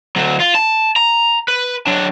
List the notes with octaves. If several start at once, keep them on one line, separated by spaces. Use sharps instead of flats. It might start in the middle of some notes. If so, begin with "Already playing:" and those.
D2 F#3
F4
A5
A#5
B4
F#3 D4